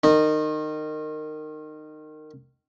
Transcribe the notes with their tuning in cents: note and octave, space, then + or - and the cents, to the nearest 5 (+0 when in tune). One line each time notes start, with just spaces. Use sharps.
D#3 -20 D#4 -20